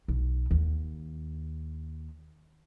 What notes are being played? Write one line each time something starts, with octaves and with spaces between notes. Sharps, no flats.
B1
D#2